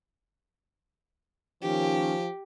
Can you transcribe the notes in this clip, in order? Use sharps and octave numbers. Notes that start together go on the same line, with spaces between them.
D#3 F3 A#3 C#4 G4